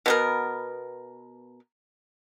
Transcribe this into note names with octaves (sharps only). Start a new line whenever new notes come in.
B2 B3 A#4